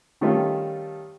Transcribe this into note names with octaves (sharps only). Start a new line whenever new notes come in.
D#3 G3 A3 C#4 F4